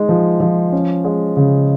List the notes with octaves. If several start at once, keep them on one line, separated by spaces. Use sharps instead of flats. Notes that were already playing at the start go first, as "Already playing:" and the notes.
Already playing: G#3 D#4
F3
F3
C#4
G#3
C#3